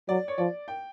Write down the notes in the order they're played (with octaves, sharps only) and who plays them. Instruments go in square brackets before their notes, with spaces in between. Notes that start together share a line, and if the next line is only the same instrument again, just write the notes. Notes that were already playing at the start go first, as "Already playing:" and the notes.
[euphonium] F#3 [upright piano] D5
[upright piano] C#5
[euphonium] F3 [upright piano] D5
[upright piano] G5